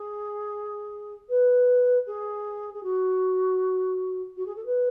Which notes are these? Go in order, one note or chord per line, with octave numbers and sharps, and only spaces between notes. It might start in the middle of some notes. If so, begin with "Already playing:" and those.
Already playing: G#4
B4
G#4
G#4
F#4
F#4
G#4
A4
B4